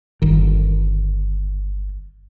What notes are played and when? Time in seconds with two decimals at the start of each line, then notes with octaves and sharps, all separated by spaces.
0.22 G1 D#3